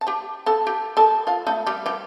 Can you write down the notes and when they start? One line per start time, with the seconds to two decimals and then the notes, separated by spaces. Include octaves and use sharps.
0.01 A5
0.07 G4 G5
0.46 A4 A5
0.67 G4 G5
0.97 A4 A5
1.27 F4 F5
1.47 A3 A4
1.67 G3 G4
1.86 G3 G4